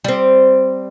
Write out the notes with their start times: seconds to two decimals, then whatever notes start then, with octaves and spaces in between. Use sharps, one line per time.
0.04 G3 C4